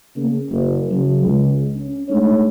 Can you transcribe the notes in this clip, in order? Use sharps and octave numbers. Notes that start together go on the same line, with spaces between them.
C#3 A#3
F#1
C#3 F#3
C#2
C#4
G#3 A3 D4 D#4 C#5